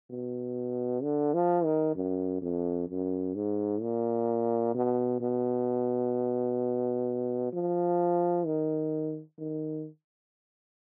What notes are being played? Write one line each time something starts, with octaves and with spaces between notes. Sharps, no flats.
B2
D3
F3
D#3
F#2
F2
F#2
G#2
A#2
B2
B2
F3
D#3
D#3